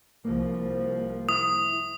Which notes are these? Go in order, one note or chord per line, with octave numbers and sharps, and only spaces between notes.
C2 F3 A#3
E4 D#6